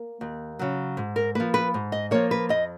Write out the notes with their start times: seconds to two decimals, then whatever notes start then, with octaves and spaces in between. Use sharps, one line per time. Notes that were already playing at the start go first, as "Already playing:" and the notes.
Already playing: A#3
0.21 D#2
0.59 C#3 F#3
0.97 G#2
1.16 A#4
1.35 F3 A#3 B4
1.54 B4
1.74 G#2
1.92 D#5
2.11 F3 A#3 C#5
2.31 B4
2.49 F2 D#5